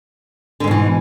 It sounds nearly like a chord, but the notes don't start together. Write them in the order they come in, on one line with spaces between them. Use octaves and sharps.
D3 G#2 B2 E3